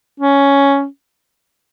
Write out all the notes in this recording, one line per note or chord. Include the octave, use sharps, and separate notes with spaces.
C#4